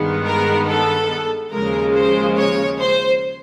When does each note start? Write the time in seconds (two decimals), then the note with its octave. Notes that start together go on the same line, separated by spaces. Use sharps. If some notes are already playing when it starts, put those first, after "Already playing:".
Already playing: G2 D#3 G#3 B3
0.25 A#4
0.67 A4
1.51 D#2 C#3 F3 G#3 A#4
1.95 C5
2.36 C#5
2.79 C5